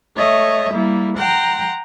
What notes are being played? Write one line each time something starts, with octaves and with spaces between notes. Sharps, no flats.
A3 C#5 D#5 E5
G3 A#3 E4
F#5 G5 A#5 C6